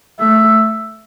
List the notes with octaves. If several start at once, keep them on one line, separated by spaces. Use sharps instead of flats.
A3 E5